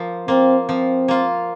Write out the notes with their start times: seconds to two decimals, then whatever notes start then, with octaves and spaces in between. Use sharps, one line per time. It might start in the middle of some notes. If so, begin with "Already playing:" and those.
Already playing: F3 A#3 F4
0.28 A#3 C4 F4
0.68 F3 C4
1.08 A#3 F4